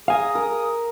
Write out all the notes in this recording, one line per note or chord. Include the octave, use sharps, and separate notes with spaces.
G#4 F5 G#5 A#5 D#6
A#4